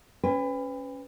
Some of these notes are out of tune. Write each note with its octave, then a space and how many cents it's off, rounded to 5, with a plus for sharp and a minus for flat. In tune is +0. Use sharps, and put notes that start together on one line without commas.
C#4 +0 B4 +25 G5 +45